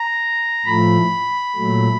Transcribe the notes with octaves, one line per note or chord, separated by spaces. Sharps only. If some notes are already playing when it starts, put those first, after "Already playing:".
Already playing: A#5
A2 F3 A3 B5
A#2 F#3 A3